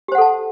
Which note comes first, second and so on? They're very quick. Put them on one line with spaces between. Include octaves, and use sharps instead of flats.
G4 C5 F#5 A4 A5